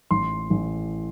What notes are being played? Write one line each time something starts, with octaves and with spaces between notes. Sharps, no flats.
A1 C6
A1